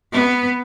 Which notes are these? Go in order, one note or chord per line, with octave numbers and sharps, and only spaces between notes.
B3